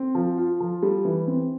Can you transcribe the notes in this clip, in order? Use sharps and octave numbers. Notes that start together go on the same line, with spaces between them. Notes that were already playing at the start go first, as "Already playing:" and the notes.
Already playing: C4
F3
F4
F3
G3
E3
C4